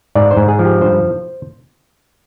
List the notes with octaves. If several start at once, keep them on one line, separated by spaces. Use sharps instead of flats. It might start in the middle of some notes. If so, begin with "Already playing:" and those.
G#2 D5
C5
G#2
G#4
F3
G4
G2 C5